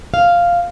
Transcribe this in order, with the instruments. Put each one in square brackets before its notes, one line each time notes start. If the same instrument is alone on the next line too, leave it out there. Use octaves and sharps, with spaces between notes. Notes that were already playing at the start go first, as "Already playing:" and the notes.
[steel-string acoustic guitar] F5